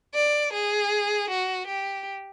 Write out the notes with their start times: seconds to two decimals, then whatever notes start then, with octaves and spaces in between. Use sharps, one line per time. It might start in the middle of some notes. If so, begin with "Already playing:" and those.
0.15 D5
0.53 G#4
1.30 F#4
1.68 G4